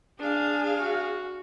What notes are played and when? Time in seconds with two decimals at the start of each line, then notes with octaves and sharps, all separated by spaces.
0.19 D4 G#4 F5
0.80 F#4